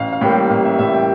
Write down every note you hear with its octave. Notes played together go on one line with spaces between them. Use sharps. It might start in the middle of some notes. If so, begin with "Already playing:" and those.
Already playing: A1 F5
F5
A2 G3 A#3 G5
A1 F5
E5
A2 G3 A#3 E5
G5